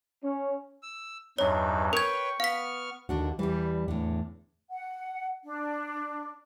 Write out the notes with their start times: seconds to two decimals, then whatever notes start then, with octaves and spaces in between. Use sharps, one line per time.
0.23 C#4
0.83 E6
1.38 E2 G2 F#3 D#4 C#5
1.93 A#4 B4 C#5 G5 C#6 G#6
2.40 B3 F5 F6 B6
3.09 D#2 D3 D4 F#4
3.39 E2 E3 G3
3.88 E2 A2 D3
4.70 F#5
5.44 D4